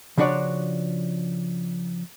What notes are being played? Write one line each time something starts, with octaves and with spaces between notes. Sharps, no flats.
C#3 F3 D4 F#4 C#5 D5